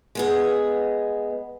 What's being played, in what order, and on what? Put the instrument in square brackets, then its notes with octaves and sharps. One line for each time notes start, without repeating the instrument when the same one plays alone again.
[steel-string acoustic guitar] G#3 B3 G#4